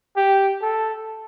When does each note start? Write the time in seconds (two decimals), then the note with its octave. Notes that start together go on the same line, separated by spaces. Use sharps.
0.17 G4
0.62 A4